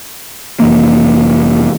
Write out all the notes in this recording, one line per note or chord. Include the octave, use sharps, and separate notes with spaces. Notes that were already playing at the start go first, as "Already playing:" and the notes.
F1 E3 A#3